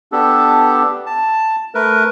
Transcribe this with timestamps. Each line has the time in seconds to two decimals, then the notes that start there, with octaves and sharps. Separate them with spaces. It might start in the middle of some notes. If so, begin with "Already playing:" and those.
0.12 B3 D4 G4 A4
1.06 A5
1.75 A3 A#4 B4